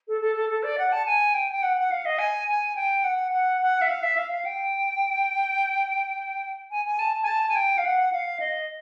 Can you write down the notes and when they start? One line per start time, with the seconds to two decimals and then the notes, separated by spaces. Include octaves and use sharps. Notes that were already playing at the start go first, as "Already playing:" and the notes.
0.08 A4
0.21 A4
0.35 A4
0.49 A4
0.63 D5
0.78 F#5
0.92 A5
1.06 G#5
1.34 G5
1.51 G5
1.63 F#5
1.77 F#5
1.91 F5
2.05 D#5
2.19 G#5
2.48 G#5
2.76 G5
3.04 F#5
3.31 F#5
3.61 F#5
3.81 E5
3.88 F5
4.03 E5
4.17 F5
4.31 F5
4.45 G5
6.71 G#5
6.85 G#5
6.99 A5
7.23 G#5
7.27 A5
7.48 G#5
7.55 G5
7.78 F5
7.85 F#5
8.12 F5
8.40 D#5